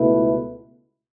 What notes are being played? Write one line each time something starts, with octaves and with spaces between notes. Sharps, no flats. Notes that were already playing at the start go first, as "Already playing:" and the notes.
Already playing: C#2 B2 A3 E4 B4